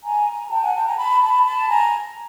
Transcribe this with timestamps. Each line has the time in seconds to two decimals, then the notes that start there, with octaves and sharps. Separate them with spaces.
0.02 G#5 A#5
0.50 G5 A5
0.62 F#5 G#5
0.74 G5 A5
0.86 G#5 A#5
0.98 A5 B5
1.21 A5 B5
1.45 A5 B5
1.69 G#5 A#5